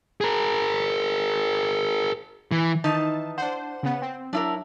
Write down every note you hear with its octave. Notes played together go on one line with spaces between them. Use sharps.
G#4 A#4
E3
D#3 E3 D#4 A5
D4 C5 F#5
C#3 B3
C4
F#3 D4 E4 A#4